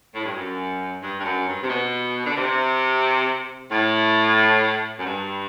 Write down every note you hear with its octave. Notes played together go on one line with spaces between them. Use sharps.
A2
G2
F#2
G2
G2
F#2
G2
C3
B2
D3
C3
A2
F#2
G2